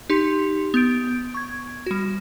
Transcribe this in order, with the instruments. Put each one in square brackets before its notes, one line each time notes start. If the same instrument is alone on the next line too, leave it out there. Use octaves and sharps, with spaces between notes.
[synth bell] D#4 G4 C6
B3 G6 D7
C#6 G#6
G3 F#4